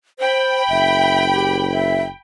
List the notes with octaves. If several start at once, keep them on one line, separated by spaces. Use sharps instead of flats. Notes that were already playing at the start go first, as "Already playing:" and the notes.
C5 G5 B5
F#1 E5
G4
E5